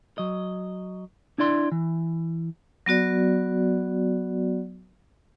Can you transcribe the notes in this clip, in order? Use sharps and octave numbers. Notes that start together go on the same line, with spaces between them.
F#3 D#5
D4 E4 D5 C6
E3
F#3 B3 F#4 D5